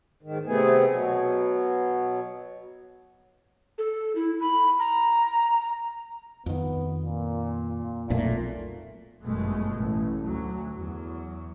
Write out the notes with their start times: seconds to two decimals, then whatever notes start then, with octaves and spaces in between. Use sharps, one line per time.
0.23 G#2 D#3
0.46 C3 A3 B3 G#4
0.89 B2 F#3
3.78 A4
4.15 E4
4.41 B5
4.80 A#5
6.46 F2 D#3 B3
7.06 A#2
8.10 B1 F2 A#2 A3
9.22 G1 F#2 B2 G#3 A3
9.75 A1
10.23 D2 F#3
10.71 E2 F#3